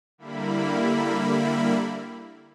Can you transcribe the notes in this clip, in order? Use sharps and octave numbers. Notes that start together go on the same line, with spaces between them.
D3 G3 A#3 E4 B5